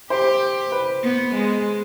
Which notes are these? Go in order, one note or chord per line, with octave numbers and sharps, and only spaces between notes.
G4 C5
B4
B3
G#3